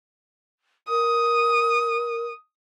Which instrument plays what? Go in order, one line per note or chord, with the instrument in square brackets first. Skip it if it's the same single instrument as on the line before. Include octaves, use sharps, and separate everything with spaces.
[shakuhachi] A#4 [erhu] D#6